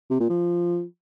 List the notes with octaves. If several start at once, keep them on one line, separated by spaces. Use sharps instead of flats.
C3
A#2
F3